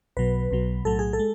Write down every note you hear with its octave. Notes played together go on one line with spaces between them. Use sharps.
B1 B2 F#3 B4
B1 B2 F#3
B1 A2 F#3 A4
G#4
A4
G#3